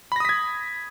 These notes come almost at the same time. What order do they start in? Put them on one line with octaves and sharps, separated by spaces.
B5 A#6 D#6 B6 G#6